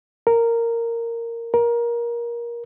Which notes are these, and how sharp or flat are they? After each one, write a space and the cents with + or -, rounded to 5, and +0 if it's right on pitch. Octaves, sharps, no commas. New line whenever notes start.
A#4 -10
A#4 +20